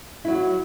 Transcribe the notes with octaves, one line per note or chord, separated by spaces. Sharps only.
F#3 E4 F#4